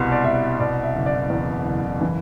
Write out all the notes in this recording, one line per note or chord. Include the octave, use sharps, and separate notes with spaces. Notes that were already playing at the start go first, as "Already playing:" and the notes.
Already playing: C2 B2 G3 C6
D5
C2 E5
B2 D5
E5
F#1
D5
E2
F#1
E3